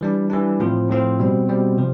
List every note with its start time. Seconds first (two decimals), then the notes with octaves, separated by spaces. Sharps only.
0.01 E3 G3 D4
0.30 E3 G3 D4
0.60 A2 F3 C4 F4
0.89 A2 F3 C4 F4
1.19 B2 G3 C4
1.48 B2 G3 C4
1.78 C3 F3